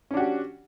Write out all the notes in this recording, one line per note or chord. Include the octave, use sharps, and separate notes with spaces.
C#4 D4 F#4 G4